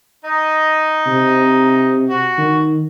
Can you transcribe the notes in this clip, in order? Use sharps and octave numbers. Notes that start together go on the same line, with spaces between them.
D#4 D#5
C3
F#4
D#3